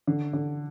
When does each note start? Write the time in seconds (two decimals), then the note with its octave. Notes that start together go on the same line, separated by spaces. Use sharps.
0.07 D3
0.33 D3